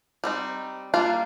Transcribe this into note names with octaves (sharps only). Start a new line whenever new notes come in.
G3 C4 D#4
G3 A#3 D4 F4 F5